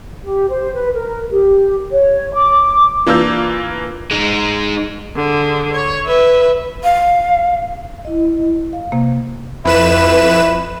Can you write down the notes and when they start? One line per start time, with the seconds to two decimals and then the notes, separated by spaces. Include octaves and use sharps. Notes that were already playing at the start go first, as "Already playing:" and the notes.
0.23 G4
0.49 C5
0.74 B4
0.94 A#4
1.31 G4
1.92 C#5
2.33 D6
3.07 E3 A#3 D4 F4 E6 G6
4.11 G#3 D#4
5.16 D3 G#4
5.73 C#5
6.07 B4 E5
6.84 F5
8.05 E4 D#5
8.73 F5
8.92 C3 A#3
9.65 F2 E4 B4 B5 E7